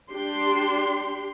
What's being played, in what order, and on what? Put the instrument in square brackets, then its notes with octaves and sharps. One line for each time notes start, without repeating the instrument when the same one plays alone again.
[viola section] D4 G4 C6